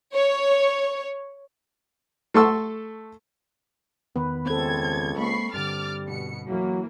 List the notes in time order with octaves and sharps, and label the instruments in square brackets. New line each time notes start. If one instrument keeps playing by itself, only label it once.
[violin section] C#5
[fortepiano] A3 A4 C6 C#6 E6
[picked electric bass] E2 D#3 B3 [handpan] B4
[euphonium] C#2 [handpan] C4 A4 [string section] G#6
[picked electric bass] G#3 A#3 [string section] B5 C#6 C7
[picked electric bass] G2 D3 [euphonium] G3 [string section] D6 F6 A6
[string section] B2 C#7
[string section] F#2 E3 A#3 [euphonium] F#3